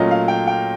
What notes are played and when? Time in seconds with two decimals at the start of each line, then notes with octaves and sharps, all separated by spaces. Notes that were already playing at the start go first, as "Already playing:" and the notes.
Already playing: A#2 F#3 A3 C#4 F4 D#5
0.11 F5
0.28 G5
0.47 G5